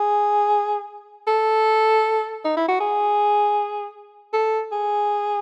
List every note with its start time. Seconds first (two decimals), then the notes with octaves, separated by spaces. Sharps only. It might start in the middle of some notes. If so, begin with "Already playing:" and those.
Already playing: G#4
1.27 A4
2.45 D#4
2.57 E4
2.68 F#4
2.80 G#4
4.33 A4
4.72 G#4